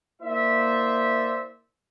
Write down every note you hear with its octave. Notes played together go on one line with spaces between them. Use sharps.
A#3 E4 C5 D5 E5